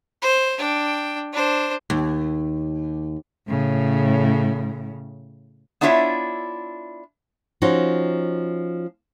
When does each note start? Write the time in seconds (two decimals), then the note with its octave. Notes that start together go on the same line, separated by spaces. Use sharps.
0.22 C5
0.58 D4 G5
1.33 D4 C5
1.90 D#2
3.47 A2 C#3
5.81 B3 D4 E4 F4 C#5 E5
7.62 F3 C#4 D#4 F#4